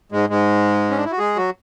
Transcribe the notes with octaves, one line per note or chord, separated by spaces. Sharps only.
G#2 G#3
G#2 G#3
C#4
D4
E4
F#4
G#3 G#4
F#3 F#4